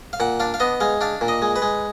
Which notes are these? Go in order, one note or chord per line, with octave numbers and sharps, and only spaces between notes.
F5
A#2 F#5
D4 F5
F5
B3 D#5
G#3 F5
D4 F5
A#2
D#5
G#3
B4
G#3